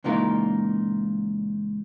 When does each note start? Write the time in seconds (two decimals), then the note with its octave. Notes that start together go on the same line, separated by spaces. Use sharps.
0.04 C#2 A#2 E3 D#4 F4 A#4